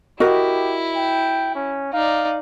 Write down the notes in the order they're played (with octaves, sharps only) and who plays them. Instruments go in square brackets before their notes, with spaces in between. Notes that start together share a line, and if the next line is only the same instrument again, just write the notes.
[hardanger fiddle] E4 [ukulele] F#4 A#4 D#5 [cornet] G4
[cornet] G5
C#4
[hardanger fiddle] D#4 D5 [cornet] F5